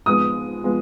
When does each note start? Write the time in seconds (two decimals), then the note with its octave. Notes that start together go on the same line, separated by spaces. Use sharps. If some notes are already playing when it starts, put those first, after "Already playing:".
0.06 G#2 F3 G#3 B3 D#6
0.64 F3 G#3 B3